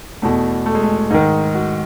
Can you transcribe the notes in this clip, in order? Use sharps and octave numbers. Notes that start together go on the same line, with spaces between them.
E2 B2 A3
A3
G#3
A3
G#2 D#3 D#4
F#4